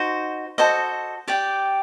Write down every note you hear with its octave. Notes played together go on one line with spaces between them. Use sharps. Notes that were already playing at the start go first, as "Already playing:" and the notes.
Already playing: D#4 F#4 C5
F#4 A4 C5 D#5
G4 D5 G5